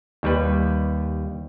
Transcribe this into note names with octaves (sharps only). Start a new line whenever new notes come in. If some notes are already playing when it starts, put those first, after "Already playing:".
D#2 G3 B4